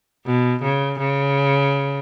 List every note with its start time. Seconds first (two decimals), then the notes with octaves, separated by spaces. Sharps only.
0.26 B2
0.63 C#3
0.99 C#3